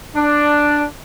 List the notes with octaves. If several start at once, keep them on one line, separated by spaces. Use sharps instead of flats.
D4